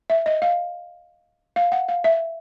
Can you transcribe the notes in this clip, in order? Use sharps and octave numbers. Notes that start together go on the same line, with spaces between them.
E5
D#5
F5
F5
F#5
F5
E5